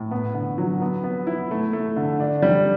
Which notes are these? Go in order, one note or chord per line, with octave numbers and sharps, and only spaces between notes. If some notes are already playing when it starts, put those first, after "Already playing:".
Already playing: A2
B3
D3
F#3
B3
B3
E4
A3
A3
D3
D4
G3